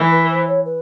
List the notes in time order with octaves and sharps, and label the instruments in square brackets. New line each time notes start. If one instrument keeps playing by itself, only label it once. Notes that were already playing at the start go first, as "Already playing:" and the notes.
Already playing: [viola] E3
[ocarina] B4
C5
C#5
B4